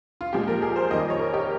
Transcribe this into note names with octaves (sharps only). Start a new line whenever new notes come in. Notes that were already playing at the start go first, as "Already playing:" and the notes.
F4
A#2 F3 G#3 G4
A#4
G#4
C5
F2 D#3 G3 D#5
C#5
A#4
G4